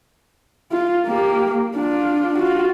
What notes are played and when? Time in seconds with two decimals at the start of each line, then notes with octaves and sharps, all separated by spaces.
0.72 F4
1.07 A#3 G4
1.75 D4 F4
2.38 F4 F#4